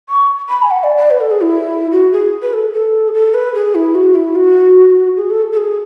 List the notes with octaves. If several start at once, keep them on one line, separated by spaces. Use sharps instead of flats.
C#6
B5
G#5
F#5
D5
D5
B4
A4
G#4
E4
F#4
G#4
B4
A4
A4
G#4
A4
B4
G#4
E4
F#4
E4
F#4
G#4
A4
A4
G#4